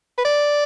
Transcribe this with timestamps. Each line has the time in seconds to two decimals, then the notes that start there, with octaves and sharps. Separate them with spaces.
0.18 B4
0.25 D5